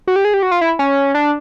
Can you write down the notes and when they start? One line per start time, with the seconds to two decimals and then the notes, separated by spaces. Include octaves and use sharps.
0.07 F#4
0.16 G4
0.25 G#4
0.34 G4
0.43 F#4
0.51 F4
0.61 E4
0.79 C#4
1.14 D4